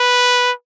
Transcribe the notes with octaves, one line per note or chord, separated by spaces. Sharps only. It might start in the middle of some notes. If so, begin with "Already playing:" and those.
Already playing: B4